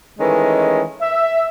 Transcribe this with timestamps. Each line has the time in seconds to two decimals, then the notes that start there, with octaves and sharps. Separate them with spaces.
0.20 D#3 E3 G#3 A3 C#4
1.01 E5